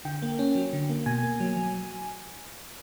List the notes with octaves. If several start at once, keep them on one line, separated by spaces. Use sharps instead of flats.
D3 G5
A#3
C#4
F#3
D3
A#3
B2 G#5
A#3
F#3
F#3